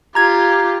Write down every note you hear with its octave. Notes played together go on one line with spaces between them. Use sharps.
F4 G4 A#5 G#6